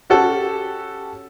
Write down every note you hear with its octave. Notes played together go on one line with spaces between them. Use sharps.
C#4 F#4 G4 A4